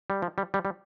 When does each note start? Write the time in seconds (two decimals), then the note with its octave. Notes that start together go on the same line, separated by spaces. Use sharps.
0.10 G3
0.22 F3
0.38 G3
0.54 G3
0.65 G3